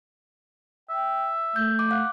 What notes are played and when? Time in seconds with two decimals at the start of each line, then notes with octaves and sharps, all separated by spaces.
0.89 E5 G5
1.56 A3 G6
1.79 D6
1.91 F5 F#5